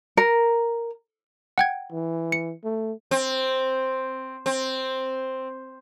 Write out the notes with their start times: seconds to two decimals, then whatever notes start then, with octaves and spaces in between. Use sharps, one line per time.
0.17 A#4
1.58 F#5 G5 G#6
1.92 E3
2.32 C#7
2.64 A3
3.11 C4
4.46 C4